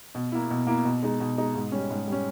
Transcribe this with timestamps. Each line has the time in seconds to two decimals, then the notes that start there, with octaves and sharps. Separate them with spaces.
0.15 B2
0.32 A#3 E4
0.50 B2
0.67 A#3 E4
0.85 B2
1.03 G#3 D#4
1.20 B2
1.37 G#3 D#4
1.55 G#2
1.72 G3 C#4
1.90 G#2
2.07 G3
2.12 C#4